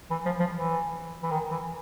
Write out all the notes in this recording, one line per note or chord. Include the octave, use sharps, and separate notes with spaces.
E3
F3
F3
E3
E3
D#3
E3